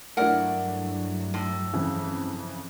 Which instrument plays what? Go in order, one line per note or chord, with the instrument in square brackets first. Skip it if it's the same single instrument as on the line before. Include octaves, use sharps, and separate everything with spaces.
[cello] G2 F#3 [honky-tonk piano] A3 D4 E4 [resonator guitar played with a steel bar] A#4 F#5
[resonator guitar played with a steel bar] A2
[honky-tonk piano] F2 C#3 E3